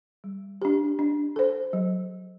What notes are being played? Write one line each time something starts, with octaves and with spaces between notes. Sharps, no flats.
G3
D4 G4
D4
A4 C5
F#3